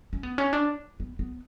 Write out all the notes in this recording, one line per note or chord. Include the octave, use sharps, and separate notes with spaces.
C#4
B3
C#4
D4
B3
B3